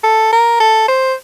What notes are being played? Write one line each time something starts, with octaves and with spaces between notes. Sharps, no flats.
A4
A#4
A4
C5